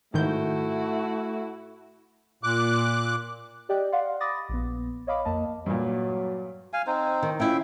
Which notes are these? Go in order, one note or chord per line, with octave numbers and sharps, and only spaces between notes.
G#2 D#3 A3 E4 F#4 G6
A#2 D6 F#6
G4 D5 D#5 G5 D6 F#6
D5 F5 F#5 C6
B5 D6 D#6 A6 A#6
A#1 B3
C#5 D#5 F5 B5 D6
F2 A#3 D#5 A5
G2 A#2 F#3
F5 G#5
C4 D#4 C5
D#3
C#4 E4 F4 E5 G5